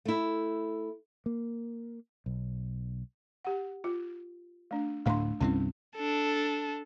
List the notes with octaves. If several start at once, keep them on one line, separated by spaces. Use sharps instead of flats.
A3 E4
A#3
B1
G4 F#5
F4
A3 D4
D1 A2 A3 D4 C6
C2 G2 C4 C#4 E4
D4 A4